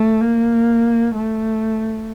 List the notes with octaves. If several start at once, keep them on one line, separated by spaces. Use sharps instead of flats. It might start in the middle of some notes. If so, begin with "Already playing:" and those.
Already playing: A3
A#3
A3